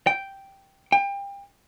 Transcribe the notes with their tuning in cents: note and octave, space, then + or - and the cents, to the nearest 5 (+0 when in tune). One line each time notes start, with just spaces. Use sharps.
G5 -5
G5 +30